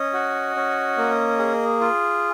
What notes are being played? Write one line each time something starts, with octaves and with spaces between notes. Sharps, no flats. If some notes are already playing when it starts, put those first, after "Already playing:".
Already playing: C#4 D#5
F#4
C#4
A#3
G#4
F4